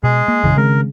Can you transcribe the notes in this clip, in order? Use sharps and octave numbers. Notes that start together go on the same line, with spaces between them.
B2 G#3 G#4
A#3
A#1 F#2 C#3 E3
D#3 G#3 C4 A#4